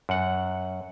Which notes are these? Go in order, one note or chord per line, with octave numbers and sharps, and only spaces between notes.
F#2 F#5